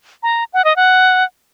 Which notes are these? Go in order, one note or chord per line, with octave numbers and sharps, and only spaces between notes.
A#5
F#5
D#5
F#5